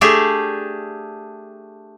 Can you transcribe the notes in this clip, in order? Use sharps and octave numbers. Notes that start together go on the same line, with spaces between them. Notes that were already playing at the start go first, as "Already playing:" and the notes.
A3 D4 G4 G#4